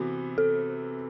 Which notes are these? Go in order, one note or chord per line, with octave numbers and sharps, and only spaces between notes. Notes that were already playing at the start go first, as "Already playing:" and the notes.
Already playing: C3 E3 B3 F#4
A4